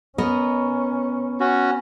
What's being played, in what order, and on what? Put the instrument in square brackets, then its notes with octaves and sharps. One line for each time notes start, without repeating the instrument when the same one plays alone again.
[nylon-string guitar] B3 A#4 D#5 [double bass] C#4
[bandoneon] C#4 F#4